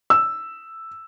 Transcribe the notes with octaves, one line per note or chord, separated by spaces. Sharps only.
E6